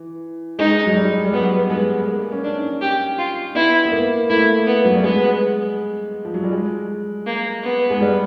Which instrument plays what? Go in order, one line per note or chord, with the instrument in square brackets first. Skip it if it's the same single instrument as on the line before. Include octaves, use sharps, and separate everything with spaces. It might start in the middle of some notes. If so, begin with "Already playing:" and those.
Already playing: [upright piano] E3
[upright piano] G#3 [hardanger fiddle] D#4
[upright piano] F#3
G3
G3
[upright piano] F#3 [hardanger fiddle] B3
[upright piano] G#3 [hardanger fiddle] B3
[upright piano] A#3
C#4
[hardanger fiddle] D4
[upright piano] D#4
[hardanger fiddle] G4
F4
[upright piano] B3 [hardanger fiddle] E4
[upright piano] B3
A#3
[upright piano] A3 [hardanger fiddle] E4
[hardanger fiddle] B3
[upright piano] F#3
G3
[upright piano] G#3 [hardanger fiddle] B3
[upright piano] F3
F#3
G3
G#3
[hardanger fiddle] A#3
B3
[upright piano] G#3
G3